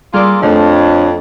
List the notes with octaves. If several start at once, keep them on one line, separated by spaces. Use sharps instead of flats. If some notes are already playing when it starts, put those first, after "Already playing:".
G3 A#3 F4 G#4 D5 E6
F2 A3 D4 C#5